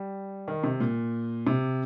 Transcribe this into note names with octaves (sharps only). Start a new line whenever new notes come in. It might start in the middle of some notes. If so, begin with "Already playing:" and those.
Already playing: G3
D#3
C3
A#2
C3